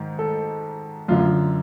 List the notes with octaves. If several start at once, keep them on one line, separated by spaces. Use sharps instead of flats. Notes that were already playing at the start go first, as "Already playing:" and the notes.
Already playing: G#2 D#3
A4
F#2 D3 F4